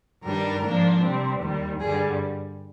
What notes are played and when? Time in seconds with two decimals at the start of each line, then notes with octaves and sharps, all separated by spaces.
0.23 G2 D#3 G3 D4 A#4
0.62 G#2 F3 A#3 D4
1.01 C3 G3 C4
1.41 D#2 D#3 G3
1.80 G2 D3 G3 G#4